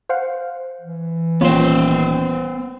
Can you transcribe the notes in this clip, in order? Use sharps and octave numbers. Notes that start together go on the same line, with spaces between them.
C5 F5 F#5
E3
D#1 B3 F4 C5 C#5